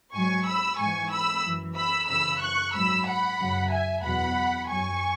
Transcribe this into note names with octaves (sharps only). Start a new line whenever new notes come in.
G#2 F#3 G#5 C#6
B5 E6
G#2 E3 G#5 C#6
B5 E6
F#2 E3
B5 E6
F#2 C#3 E3 B5 E6
C#6 F#6
G#2 F#3 B5 E6
F#5 B5
F#2 C#3 F#3
E5 G#5
E2 B2 F#3 F#5 B5
F#2 F#3 G#5 C#6